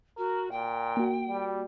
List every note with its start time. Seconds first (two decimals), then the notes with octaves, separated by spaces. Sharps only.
0.18 F#4 A#4
0.51 A#2 G5
0.97 A#3 F#4
1.28 G3